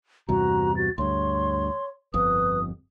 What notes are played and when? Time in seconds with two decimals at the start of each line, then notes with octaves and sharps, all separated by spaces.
0.29 E2 G2 C3 F#4 A#5
0.77 F#4 A6
0.98 D2 G2 C#5 C6
2.14 G1 F2 B4 D#6